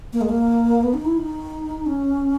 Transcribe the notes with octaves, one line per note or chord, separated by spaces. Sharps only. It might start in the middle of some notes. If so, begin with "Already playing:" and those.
A#3
G#3
A#3
B3
D#4
E4
D#4
C#4